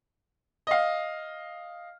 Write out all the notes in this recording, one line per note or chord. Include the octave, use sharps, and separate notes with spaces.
D#5 F5